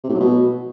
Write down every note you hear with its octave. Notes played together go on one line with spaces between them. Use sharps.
C3
A2
F#3
B2